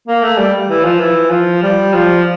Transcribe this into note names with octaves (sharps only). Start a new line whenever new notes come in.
A#3
A3
G3
E3
F3
E3
F3
G3
F3